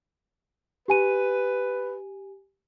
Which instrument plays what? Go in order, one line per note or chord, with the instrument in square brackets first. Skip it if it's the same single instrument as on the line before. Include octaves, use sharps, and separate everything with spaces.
[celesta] G4 G#5 D#7 [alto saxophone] B4